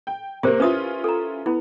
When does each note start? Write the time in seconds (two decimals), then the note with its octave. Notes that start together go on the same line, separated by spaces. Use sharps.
0.07 G5
0.43 C3 A#3 G4 A#4 C5
0.60 C#4 E4 F4 B4 D#6
1.04 A4 A#5
1.46 B3 E4